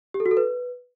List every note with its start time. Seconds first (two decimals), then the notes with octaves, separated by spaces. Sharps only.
0.14 G4
0.20 A4
0.26 F#4
0.31 A4
0.37 B4